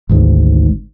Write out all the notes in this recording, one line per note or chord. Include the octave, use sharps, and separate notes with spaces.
G#1 D2 G#2